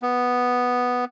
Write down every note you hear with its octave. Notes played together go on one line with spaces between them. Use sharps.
B3